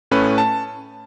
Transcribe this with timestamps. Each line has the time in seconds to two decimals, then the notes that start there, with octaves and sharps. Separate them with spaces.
0.11 A2 A3 C#4 B4
0.38 A5